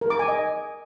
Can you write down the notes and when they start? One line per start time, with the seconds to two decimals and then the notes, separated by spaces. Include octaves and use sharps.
0.01 A#4
0.10 D6
0.19 G#5
0.28 D#5